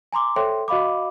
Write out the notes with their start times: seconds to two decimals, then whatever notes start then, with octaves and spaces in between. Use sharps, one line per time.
0.13 G#5 A#5 C6 D6
0.36 A4 C5 C#5 E5 G5 C6
0.68 F#4 D#5 F5 B5 D6